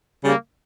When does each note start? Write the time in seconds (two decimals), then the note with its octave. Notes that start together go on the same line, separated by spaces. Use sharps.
0.23 C#3 G3 A#3